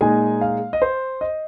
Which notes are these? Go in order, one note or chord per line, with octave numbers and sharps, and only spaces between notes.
A#2 G#3 D#4 G#5
F5
D#5
C5
D#5